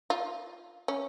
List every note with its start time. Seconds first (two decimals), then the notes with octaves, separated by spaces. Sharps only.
0.10 F4
0.88 C#4